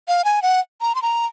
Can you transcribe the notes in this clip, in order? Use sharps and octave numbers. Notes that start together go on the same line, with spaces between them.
F5
G#5
F#5
A#5
C6
A#5